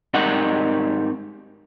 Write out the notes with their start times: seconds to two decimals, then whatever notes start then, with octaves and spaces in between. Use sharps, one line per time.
0.14 G#2 G3 C4 D#4 A#4 F#5